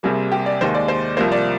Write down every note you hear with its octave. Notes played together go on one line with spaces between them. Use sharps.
C2 C3 G3 A#3 G#4
G4
D5
D#2 D#3 G#3 C5
D5
C5
C2 C3 F3 A#3 C5
D5